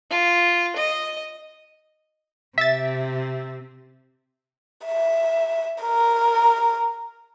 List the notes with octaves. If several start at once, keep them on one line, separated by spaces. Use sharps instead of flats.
F4
D#5
C3 E5 A6
E5
A#4